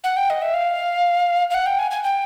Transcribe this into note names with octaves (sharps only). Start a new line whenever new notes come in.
F#5
G5
D#5
E5
F5
F5
F#5
G5
G#5
G#5
G5